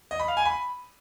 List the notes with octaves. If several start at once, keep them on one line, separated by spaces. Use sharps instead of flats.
D#5
B5
F5
G#5
B5